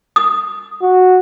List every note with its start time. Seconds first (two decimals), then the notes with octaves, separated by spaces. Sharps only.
0.16 D#6
0.82 F#4